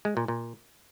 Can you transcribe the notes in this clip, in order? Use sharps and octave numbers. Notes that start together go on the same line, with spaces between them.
G#3
A#2
A#2